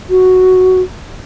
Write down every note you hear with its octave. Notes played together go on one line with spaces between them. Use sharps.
F#4